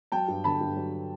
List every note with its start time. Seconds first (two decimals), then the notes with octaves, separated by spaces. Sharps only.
0.12 F#3 G5 A5
0.28 G2
0.44 D3 A5 B5
0.61 G2
0.76 F#3